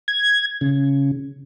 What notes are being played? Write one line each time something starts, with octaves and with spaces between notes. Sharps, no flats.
G#6
C#3